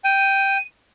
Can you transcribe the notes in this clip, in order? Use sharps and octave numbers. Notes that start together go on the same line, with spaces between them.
G5 D#7